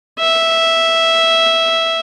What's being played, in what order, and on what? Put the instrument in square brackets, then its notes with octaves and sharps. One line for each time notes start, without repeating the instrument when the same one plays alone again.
[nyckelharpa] E5